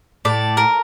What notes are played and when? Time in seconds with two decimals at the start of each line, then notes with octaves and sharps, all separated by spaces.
0.25 A2 D5
0.57 A#4